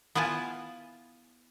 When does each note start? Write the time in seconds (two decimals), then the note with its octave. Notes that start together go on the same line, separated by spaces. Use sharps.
0.15 B3 E4 F4 G#5 A5